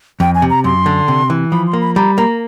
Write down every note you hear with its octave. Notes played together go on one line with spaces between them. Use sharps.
F2 G5
G#5
C3
A#5
F#2 C6
D3
C3
E3
F3 B5
C6
A#3
B5
G3 A#5
A#3 A#5